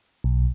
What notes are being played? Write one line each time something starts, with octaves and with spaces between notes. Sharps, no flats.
B1